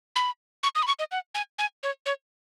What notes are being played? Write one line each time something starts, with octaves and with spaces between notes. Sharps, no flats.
B5
C#6
D#6
B5
C#6
D#5
F#5
G#5
G#5
C#5
C#5